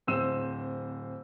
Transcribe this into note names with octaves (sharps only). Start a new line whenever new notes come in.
D1 C4 C5 E6 E7